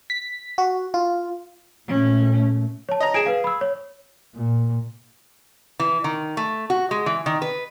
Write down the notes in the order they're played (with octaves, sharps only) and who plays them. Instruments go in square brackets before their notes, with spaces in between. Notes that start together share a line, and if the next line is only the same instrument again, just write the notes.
[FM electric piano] B6
F#4
F4
[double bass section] A#2 A3 [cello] C#4
[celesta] C#5 A5
[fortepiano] D#5 A#5
[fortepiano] G#4 [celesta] D7 E7
[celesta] B4 F5
B5 E6
C#5
[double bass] A#2
[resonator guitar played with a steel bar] E3
D#3
A3
F#4
G#3
E3
D#3
B4